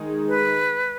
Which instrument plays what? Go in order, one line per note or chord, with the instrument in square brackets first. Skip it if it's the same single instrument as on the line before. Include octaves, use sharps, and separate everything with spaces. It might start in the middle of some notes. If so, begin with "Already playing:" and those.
Already playing: [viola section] D#3 G#3 D#4 G#4
[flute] B4